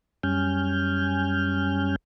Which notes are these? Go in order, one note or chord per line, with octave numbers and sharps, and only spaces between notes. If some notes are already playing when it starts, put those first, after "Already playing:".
F#2 G3 C#4 G#5 F6 G6